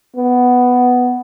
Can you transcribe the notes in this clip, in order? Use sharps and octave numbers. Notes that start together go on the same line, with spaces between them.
B3